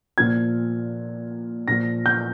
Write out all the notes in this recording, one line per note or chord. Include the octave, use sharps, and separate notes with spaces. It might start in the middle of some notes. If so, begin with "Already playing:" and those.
A#2 F3 G#6
A#2 F3 A#6
G6